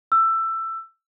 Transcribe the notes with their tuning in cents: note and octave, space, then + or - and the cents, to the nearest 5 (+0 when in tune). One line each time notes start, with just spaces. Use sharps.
E6 +15